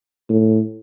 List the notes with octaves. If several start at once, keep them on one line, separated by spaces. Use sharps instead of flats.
A2